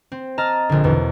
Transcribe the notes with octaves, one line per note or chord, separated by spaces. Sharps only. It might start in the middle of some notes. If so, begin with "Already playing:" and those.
C4
D#5 A5 A#5 F6 A6
A#1 D3
E2 B2